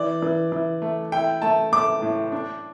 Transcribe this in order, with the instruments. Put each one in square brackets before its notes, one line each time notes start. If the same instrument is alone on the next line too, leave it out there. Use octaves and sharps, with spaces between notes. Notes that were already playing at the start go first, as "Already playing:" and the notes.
Already playing: [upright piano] E3 D5
E3
E3
A3
E4 G5
A3 A5
A3 D6
A2
D4